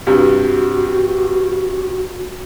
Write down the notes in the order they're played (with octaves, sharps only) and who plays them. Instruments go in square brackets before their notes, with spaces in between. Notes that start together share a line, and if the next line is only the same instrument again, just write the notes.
[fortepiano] G2 C3 [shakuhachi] F#4